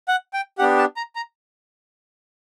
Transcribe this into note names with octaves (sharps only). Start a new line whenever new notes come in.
F#5
G5
B3 D4 G4 F#5
A5
A#5
A#5